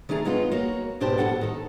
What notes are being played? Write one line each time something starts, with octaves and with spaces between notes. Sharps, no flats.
D#3 A3 D4 G#4 A#5
F#2 G#3 B3 D#4 F4
A#3 F#4 C#5
G#2 B2 D4 G4 C5 A5
F2 A2 A#3 A4 F#5 A5
D#3 A4